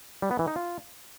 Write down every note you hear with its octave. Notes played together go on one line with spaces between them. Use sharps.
G3
B3
E3
D#4
F4